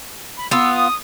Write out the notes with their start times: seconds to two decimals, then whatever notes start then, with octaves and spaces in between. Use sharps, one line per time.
0.37 B5
0.51 B3 F4 E6
0.74 D#6